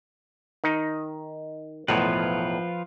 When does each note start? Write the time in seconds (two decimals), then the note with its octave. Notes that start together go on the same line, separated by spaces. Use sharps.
0.64 D#3 D#4
1.88 B1 E2 A2 F3 F4 B4